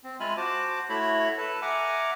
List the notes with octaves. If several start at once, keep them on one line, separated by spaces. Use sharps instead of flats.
C4
G#3 F4 E5 G#5 B5 F6
F#4 C5 A5 D6
A3 E4 F#4 C#5 E5 B5
A4 B4 A5
E5 F#5 G#5 A#5 D6 F6